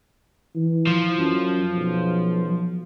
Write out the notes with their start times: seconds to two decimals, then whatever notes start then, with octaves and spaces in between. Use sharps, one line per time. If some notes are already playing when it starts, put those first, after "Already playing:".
0.55 E3
0.87 F3
1.18 F#2
1.75 B1